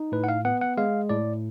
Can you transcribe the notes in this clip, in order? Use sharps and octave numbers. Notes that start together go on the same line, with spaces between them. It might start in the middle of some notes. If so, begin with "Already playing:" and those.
Already playing: D#4
A2 B4
F#5
F5
B3 F#5
F#5
G#3 F5
A2 D5